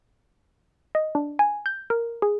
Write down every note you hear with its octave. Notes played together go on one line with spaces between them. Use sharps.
D#5
D4
G#5
G6
A#4
G#4